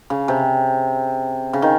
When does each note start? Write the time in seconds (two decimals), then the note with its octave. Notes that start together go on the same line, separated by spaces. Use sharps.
0.10 C#3
0.28 C3
1.53 C#3
1.62 D#3